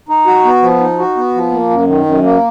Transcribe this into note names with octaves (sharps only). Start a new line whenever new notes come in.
D#4
F#4
B3
F3
D#4
F#4
B3
F3
A#3
F#2
D#3
F#2
A#3